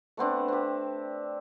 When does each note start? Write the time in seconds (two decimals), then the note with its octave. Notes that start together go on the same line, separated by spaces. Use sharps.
0.17 A3 B3 C4 D4
0.48 C4 G4